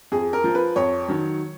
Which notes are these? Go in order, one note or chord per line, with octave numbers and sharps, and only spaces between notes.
F2 G#4
A#4
F3
B4
F2 C#5
D#3 F#3